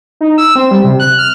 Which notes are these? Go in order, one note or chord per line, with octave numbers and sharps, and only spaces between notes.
D#4
E6
C4
G3
C3
F#6
F6